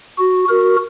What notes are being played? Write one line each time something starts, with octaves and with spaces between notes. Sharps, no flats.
F#4
F#4 A#4